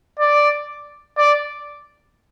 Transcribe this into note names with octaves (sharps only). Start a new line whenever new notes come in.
D5
D5